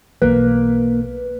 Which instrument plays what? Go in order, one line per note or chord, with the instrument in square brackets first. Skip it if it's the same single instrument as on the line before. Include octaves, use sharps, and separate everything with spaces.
[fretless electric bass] B1 E3 [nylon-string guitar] A#3 [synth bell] B4